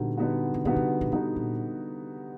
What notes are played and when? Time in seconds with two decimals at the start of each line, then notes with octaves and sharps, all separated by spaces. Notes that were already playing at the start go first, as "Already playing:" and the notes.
Already playing: A#2 D3 G3 B3 D#4 F#4
0.17 D3 G3 B3 D#4 F#4
0.54 C3
0.65 B2 D3 G3 B3 D#4 F#4
0.76 C3
1.01 B2
1.12 B2 D3 G3 B3 D#4 F#4
1.36 A#2